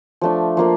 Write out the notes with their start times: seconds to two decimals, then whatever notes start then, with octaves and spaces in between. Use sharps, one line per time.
0.21 F3 A3 D4
0.57 F3 A#3 F4